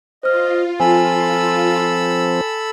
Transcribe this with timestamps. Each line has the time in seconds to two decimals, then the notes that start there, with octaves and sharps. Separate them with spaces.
0.23 F4 C5 D#5 F6
0.80 F3 C4 A4 G#5 B5 E6